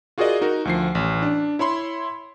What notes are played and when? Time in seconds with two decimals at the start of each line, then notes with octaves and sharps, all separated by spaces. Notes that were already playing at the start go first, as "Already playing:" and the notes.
0.18 F4 F#4 G#4 A#4 D5 D#5
0.41 D#4 F#4 A#4
0.65 D2 F3 C7
0.95 A1
1.22 D4
1.59 E4 C#5 B5 C6